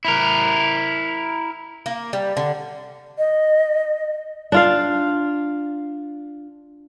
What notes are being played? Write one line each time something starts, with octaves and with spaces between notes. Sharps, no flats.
E4 A#4
A#3
G3
D3
D#5
D4 F4 F5